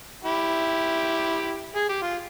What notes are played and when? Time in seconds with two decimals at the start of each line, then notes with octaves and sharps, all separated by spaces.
0.25 E4 G4
1.76 G#4
1.89 G4
2.02 F4